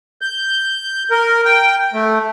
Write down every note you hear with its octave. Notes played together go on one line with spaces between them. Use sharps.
G6
A#4
G5
A3